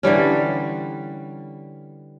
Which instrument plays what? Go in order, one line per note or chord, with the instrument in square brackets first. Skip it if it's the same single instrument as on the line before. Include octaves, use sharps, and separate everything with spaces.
[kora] D3 E3 G3 C#4